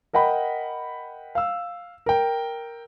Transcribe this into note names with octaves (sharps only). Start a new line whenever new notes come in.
A#4 D#5 F#5 G5 B5
F5 E6
A#4 G5